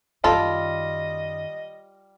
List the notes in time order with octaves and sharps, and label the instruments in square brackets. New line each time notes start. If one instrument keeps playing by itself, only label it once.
[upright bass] F#2 D#3 [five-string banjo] G3 F4 [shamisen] A4 [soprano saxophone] D#5